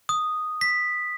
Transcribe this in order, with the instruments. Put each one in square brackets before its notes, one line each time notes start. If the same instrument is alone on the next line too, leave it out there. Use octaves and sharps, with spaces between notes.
[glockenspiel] D#6
B6